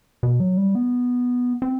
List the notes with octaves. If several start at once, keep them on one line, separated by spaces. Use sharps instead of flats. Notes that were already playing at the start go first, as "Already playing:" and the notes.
B2
F#3
G3
B3
C4